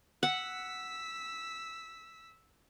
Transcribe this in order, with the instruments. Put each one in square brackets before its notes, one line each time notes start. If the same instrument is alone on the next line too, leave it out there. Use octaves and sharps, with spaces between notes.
[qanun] F#5 [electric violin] E6 B6